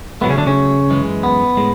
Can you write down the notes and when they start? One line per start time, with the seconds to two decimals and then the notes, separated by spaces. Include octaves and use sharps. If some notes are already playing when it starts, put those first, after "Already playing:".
0.21 A2 F#3 A3 B3
0.29 C#3 C#4
0.37 D3 D4
0.46 C#3 C#4
0.89 F#2 E3 G#3
1.23 B3
1.57 A2 G#3